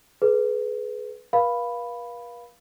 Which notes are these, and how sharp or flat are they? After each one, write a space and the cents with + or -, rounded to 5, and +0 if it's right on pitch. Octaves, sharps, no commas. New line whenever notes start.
G#4 +35 B4 +0
B4 -45 F5 +0 B5 +0